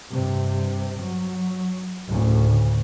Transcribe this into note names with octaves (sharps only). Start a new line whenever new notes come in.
G2 C3
F#3
D2 A2 C#3